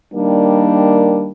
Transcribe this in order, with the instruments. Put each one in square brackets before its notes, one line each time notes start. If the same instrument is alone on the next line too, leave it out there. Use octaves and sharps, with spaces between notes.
[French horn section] D#3 G3 A#3 D4